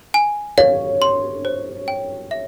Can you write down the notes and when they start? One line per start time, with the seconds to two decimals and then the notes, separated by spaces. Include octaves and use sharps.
0.14 G#5
0.58 C#5 F5
1.02 C6
1.45 C5
1.88 G5
2.31 E5